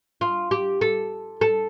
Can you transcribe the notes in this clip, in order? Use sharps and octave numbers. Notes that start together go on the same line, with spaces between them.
F4
G4
A4
A4